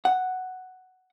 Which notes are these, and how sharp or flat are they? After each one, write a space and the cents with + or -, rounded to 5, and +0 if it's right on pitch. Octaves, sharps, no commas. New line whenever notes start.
F#5 +5